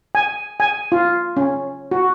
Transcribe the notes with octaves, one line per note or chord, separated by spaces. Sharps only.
G#5
G#5
F4
C#4
F#4